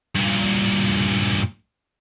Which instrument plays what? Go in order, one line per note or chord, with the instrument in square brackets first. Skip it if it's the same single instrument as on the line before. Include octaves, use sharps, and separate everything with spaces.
[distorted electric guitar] G2 A#2